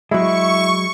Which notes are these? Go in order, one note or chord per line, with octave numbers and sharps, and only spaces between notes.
F#3 G#3 E4 C#6